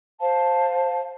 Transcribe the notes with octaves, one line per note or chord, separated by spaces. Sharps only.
C5 F5 A5